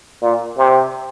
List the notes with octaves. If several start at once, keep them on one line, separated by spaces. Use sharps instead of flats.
A#2
C3